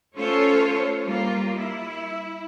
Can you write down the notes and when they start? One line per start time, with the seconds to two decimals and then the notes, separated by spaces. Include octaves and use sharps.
0.15 A3 C#4 F4 A4 C5 C#5
1.04 G3 A#3 F4
1.56 E4